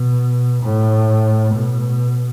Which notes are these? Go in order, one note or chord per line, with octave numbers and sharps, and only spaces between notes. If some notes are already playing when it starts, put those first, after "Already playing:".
Already playing: B2
A2
B2